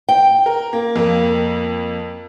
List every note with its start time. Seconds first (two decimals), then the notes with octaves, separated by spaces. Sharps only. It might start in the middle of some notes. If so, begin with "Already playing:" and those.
0.09 G5
0.46 A#4
0.73 A#3
0.96 F2 A#3